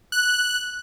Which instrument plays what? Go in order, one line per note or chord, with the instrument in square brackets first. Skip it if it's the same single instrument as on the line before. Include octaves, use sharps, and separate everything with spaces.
[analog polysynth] F#6